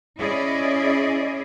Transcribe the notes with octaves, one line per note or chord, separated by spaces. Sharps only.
C#4 E4 G#4 D5 D#5